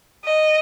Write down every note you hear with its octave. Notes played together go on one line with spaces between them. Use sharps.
D#5